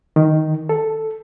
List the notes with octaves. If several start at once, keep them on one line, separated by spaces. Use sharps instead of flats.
D#3
A4